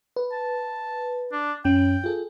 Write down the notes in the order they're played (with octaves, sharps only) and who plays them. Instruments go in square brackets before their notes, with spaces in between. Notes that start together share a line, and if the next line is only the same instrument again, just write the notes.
[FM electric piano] B4
[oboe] A5
D4
[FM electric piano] F#2 C#4 [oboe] G5
[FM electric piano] F4 G#4 A4